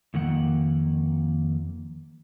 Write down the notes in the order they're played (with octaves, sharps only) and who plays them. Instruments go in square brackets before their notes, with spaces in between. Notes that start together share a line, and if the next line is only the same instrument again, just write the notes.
[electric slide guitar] F2 D#3 A#3 F#5